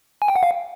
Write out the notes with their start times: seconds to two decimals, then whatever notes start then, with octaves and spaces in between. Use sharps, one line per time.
0.22 G#5
0.28 G5
0.36 F#5
0.43 F5